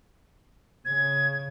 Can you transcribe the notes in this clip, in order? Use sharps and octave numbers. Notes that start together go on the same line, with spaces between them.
C#3 G#6